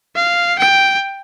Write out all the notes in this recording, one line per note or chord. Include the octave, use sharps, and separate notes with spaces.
F5
G5